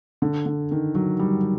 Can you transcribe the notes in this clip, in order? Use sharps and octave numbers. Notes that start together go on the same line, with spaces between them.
D3
D3
D#3
F#3
G3